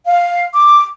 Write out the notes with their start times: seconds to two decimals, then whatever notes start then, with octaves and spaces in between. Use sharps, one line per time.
0.06 F5
0.53 D6